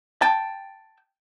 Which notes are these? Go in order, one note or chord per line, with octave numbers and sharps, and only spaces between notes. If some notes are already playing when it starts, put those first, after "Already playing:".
G5 A5